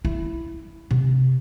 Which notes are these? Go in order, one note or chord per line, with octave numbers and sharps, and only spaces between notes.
E4
C3